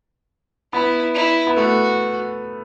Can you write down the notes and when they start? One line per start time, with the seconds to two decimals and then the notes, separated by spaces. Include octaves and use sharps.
0.73 B3 E4
1.14 E4
1.47 B3
1.56 A3 F#4